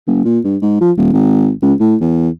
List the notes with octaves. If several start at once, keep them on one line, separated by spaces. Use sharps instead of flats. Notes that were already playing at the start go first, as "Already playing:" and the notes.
F#1
A#2
G2
G#2
F3
D#1
G#1
C#2
A2
E2